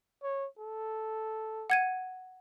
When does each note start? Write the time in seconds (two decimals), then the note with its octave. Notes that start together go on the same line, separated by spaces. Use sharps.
0.23 C#5
0.59 A4
1.70 F#5 G#6 D#7